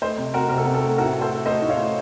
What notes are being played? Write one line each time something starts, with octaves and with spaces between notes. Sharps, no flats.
A3 C5 D#5
C3
C3 F#4 A#4
C3 A#4
A4
C3 F#4
A4
A3
A2 F#4 A#4
A3
A4 C5
A3
A3 C5 D#5
A2
C#5 F5
A3